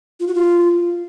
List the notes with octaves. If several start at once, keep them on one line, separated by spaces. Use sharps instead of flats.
F4
F#4
F4